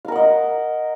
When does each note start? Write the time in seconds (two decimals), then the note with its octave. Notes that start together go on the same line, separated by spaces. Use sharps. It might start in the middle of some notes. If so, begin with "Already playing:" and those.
0.05 F5
0.08 A#4
0.12 F#5
0.16 D#5